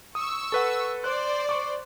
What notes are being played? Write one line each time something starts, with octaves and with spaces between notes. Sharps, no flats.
C#6 D#6 E6
A4 B4 F#5
C5 D5 F#6
C#6 D6